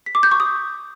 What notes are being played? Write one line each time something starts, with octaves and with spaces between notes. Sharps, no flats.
B6
D6
G6
C#6
D#6